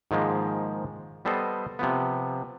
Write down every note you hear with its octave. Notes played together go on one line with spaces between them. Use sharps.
G#2 D#3 F3 G#3 A#3
G3 B3 A4 C5 D#5
C3 F3 B3